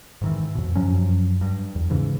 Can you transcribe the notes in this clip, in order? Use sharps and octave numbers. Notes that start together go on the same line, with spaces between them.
G#2 D#3 E3
F2 B2
F#2 F3 F#3 C#4
G2
E2
G#2 C#3 E3